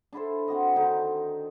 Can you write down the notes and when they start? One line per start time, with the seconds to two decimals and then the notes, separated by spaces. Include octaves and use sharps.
0.13 D4 E4 A4 C5
0.48 C4 F#4 D#5
0.75 D3 D#3 D#4